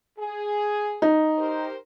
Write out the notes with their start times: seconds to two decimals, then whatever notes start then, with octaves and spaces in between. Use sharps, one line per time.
0.19 G#4
1.02 D#4
1.38 G4 A#4 C5